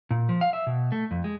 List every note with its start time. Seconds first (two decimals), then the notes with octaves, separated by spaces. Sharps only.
0.11 A#2
0.29 F3
0.41 F5
0.53 E5
0.67 B2
0.92 A3
1.11 F2
1.24 G#3